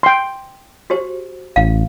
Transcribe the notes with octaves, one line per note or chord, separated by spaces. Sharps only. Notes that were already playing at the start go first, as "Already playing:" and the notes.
G5 C6
F#4 G4 C5
A1 F5